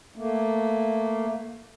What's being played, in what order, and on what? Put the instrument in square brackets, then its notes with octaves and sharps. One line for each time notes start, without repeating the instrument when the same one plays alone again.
[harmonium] A3 A#3